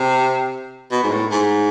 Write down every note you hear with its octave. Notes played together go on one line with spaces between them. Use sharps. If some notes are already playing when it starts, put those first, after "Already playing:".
Already playing: C3
B2
G#2
A2
G#2